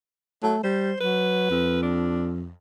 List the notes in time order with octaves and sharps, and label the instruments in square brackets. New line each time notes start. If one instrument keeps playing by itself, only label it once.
[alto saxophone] F#3 [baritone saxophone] A3
[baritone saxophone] G3 [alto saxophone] C5
[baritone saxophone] F#3 [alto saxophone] B4
[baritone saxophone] F2
[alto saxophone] D4